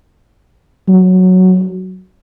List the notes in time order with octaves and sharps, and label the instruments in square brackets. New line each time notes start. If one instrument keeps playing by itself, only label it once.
[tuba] F#3